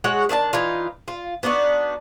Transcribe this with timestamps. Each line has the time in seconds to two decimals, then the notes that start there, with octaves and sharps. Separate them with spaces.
0.04 G#3 F#4 C#5 F#5
0.29 D#3 D4 D#5 A5
0.53 E3 D#4 F4
1.08 F4
1.43 B3 D4 D#4 F#4